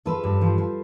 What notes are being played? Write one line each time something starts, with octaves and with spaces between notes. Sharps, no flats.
F3 A4 B4
G2
F3
F3